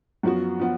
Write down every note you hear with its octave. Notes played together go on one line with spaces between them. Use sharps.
F#2 F3 B3 F#4
F3 B3